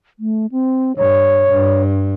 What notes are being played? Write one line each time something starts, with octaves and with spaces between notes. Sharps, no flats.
A3
C4
G2 C#5
G2